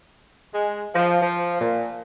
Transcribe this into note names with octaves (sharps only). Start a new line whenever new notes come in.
G#3
F3
F3
A#2